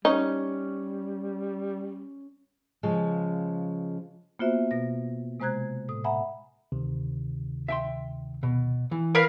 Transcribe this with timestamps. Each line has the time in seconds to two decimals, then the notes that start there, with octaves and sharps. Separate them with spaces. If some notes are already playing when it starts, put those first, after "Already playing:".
0.05 G3 C#4 D#4
2.83 C#3 F3 G#3
4.39 A#3 B3 F4 F#4 C5 E5
4.71 B2 A#6
5.40 C3 G#3 C5 A#5 F#6 G#6
5.88 A2 D#6
6.04 E5 F#5 G#5 A#5 B5
6.72 D2 C3 D#3
7.68 E5 G5 C6
8.43 B2
8.91 E3
9.15 A#4 B4 F5